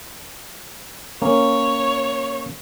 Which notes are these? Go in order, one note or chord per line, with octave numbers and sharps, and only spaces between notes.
A#3 C#4 C#5